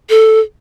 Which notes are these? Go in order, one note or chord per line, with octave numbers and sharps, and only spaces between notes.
A4